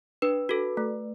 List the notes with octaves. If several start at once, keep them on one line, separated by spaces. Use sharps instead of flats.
D4 B4
F#4 A4
A3